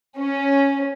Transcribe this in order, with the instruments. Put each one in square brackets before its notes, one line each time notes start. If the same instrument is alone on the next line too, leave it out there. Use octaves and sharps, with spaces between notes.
[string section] C#4